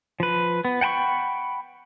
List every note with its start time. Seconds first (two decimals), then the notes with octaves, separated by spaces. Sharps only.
0.20 F3 B4
0.65 B3
0.81 F#5 G5 A5 B5 C#6